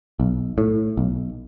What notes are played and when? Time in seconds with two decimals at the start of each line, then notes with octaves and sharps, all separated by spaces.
0.20 B1
0.58 A2
0.97 B1